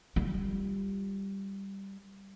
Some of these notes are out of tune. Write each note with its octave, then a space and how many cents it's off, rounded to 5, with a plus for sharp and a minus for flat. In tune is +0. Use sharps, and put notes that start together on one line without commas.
G3 +0 F4 +0